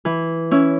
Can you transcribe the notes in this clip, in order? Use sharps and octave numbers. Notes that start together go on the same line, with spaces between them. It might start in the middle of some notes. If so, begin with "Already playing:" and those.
E3
C#4 E4